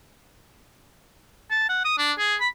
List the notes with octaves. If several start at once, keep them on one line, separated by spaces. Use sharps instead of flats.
A5
F#5
D#6
D4
G#4
B5